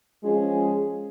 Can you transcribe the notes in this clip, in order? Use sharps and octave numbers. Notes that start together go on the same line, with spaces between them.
F3 G#3 C#4 F4 G#4